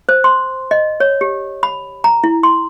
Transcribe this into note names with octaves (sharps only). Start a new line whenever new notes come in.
C5
C6
D#5
C#5
G4
B5
A#5
E4
C6